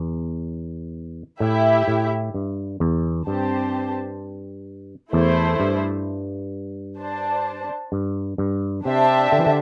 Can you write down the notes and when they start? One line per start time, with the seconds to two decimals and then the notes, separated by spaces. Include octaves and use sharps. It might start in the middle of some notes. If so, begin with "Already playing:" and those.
Already playing: E2
1.40 A2 E4 G4 E5
1.88 A2
2.34 G2
2.80 E2
3.27 G2 C4 G4 C5 A5
5.13 E2 A3 E4 C5
5.60 G2
6.99 D4 C5 A5
7.92 G2
8.38 G2
8.85 C3 D4 G4 C5 E5 A5
9.32 D3
9.38 E3
9.46 D3